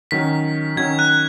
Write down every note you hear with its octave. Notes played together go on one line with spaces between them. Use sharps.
D#3 F#3 C#4 B6
D#3 F#3 C#4 G#6
F#6